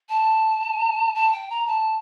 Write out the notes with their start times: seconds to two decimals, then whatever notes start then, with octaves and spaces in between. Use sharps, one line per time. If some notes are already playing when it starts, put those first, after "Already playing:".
0.09 A5
1.15 A5
1.32 G5
1.50 A#5
1.67 A5